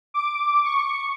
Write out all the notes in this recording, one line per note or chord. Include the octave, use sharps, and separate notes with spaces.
D6
C#6